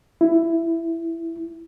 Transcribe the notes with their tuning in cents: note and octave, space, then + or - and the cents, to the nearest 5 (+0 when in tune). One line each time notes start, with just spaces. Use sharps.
E4 +10